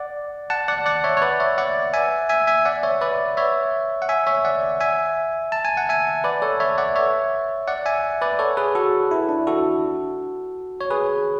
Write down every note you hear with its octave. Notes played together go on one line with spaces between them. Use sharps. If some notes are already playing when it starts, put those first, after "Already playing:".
Already playing: D5 F#5
F#5 A5
D5 F#5
D5 F#5
C#5 E5
C#5
B4 D5
C#5 E5
D5 F#5
E5 G#5
E5 G#5
E5 G#5
D5 F#5
C#5 E5
B4 D5
C#5 E5
F#5
E5 G#5
C#5 E5
D5 F#5
E5 G#5
A5
G#5
F#5
E5 G#5
B4 D5
A4 C#5
C#5 E5
D5 F#5
C#5 E5
D5 F#5
E5 G#5
B4 D5
A4 C#5
G#4 B4
F#4 A4
E4
D4
F#4 A4
C#5
G#4 B4